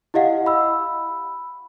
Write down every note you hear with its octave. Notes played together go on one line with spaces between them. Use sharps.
E4 G4 D#5 F5 F#5
B5 E6